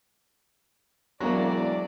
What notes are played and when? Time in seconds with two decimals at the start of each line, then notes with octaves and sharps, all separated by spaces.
1.20 E1 F#3 A#3 D5